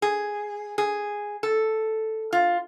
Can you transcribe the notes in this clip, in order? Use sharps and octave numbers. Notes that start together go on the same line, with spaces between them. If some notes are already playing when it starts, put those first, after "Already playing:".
G#4
G#4
A4
F4